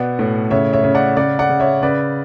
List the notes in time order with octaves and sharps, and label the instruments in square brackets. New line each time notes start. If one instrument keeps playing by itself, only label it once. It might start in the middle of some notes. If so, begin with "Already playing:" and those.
Already playing: [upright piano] B2 B3 D5 F#5
A2
C#3 C#5 E5
C#5 E5
C#3
D5 F#5
C#3 D5 F#5
D5 F#5
C#3
C#5 E5
C#3 B4 D5